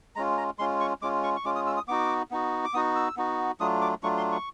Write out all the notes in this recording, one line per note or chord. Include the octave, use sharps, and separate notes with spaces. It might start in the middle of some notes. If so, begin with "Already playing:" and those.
G#3 C#4 F4 A#5
A#5
G#3 C#4 F4 C6
C#6
G#3 C#4 F4 D6
C#6
C#6
G#3 C#4 F4 D6
D#6
E6
D#6
B3 D#4 F#4 D6
B3 D#4 F#4
D6
B3 D#4 F#4 D#6
E6
B3 D#4 F#4
F#3 A3 D4 F4 D#6
D6
F#3 A3 D4 F4 C#6
C6
C#6